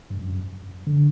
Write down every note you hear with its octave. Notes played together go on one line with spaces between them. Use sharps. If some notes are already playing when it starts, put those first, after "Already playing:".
G2
F#2
D3